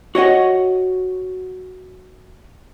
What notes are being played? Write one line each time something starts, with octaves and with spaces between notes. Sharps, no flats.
F#4 C#5 D#5 F#5